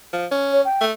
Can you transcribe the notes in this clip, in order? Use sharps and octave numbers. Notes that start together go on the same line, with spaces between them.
F3
C#4
C#5
G5
A3